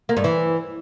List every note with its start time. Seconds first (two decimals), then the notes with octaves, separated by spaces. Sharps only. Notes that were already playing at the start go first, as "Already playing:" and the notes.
0.09 A#3
0.17 G2
0.24 E3